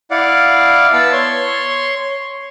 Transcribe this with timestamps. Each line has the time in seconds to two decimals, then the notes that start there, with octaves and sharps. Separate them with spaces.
0.11 E4 D5 F5 F#5
0.93 B3 A5 E6
1.13 C#5 C6